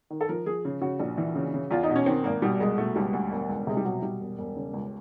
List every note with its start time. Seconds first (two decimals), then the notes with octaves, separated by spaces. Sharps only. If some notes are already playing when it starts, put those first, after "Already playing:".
0.10 D#3
0.21 A4
0.29 F3 A#4
0.46 F3 G#4
0.65 C#3
0.81 C#3 F#4
1.00 A#1
1.18 E3
1.35 C#3
1.54 C#3
1.71 E2 F4
1.83 D#4
1.90 B2
1.96 C#4
2.06 D#3 C4
2.24 G#1 A#3
2.42 B2 G3
2.60 C2 G#3
2.78 B2 A3
2.96 C#2 G3
3.13 D2
3.32 E1
3.49 C#2
3.67 C3 G#3
3.77 G3
3.85 B2 F#3
4.02 B2 G3
4.20 E1
4.38 E1
4.56 C#3
4.73 C#2